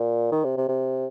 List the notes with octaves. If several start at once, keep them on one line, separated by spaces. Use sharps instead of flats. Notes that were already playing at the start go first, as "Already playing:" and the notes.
Already playing: A#2
D#3
C3
C3
C3